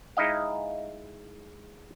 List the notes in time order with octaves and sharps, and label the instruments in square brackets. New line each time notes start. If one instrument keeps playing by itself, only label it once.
[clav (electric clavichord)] G#3 D#4 E4 D#5 F5